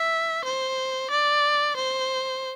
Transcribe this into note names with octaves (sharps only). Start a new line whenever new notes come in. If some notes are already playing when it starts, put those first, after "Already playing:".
Already playing: E5
C5
D5
C5